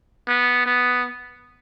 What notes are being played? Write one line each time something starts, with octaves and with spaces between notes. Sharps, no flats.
B3
B3